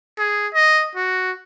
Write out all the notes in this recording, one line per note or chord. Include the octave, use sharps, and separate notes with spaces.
G#4
D#5
F#4